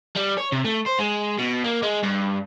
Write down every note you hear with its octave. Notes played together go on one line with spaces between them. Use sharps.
G3
C#5
C3
A3
C5
G#3
B2
A#3
G#3
G2